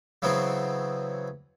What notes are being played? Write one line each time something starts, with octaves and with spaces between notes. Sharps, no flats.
C#3 E3 F#3 B3 C4